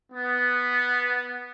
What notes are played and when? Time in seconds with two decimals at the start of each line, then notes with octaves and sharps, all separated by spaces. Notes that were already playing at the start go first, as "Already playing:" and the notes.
0.12 B3